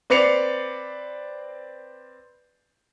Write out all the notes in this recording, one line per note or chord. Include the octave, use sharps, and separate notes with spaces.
C4 B4 D5 C7 C#7 F7